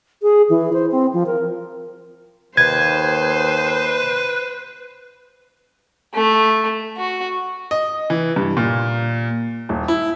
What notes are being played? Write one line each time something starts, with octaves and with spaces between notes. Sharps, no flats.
G#4
E3
C5
C4
F3
A#4
D#2 B4 C5 G#6
A3
F#4
D#5
E3
G2
A#2
D#1
E4